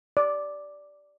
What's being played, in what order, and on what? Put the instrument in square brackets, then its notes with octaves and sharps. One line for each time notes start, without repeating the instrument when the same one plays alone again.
[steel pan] D5